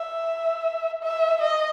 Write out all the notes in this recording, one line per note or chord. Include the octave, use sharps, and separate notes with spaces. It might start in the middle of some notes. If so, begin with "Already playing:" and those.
Already playing: E5
E5
D#5